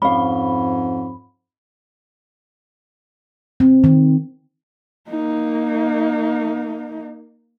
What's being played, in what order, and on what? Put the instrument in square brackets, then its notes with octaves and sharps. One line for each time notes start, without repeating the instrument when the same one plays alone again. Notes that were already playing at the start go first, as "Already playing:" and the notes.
[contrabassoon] F2 [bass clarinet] G#2 [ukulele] C#4 F5 [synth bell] B5
[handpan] C4
D#3
[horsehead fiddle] A#3 D#4